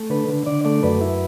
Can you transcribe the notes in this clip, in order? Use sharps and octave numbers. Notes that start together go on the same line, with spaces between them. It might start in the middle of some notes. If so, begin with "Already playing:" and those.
Already playing: A3
D3 B4
D3
D3 D5
A3 D5
F#2 B4
E4